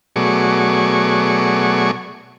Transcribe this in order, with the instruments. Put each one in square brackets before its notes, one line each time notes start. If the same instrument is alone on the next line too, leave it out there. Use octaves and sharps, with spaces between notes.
[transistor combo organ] B2 F#3 A3 G#4 D5 C#6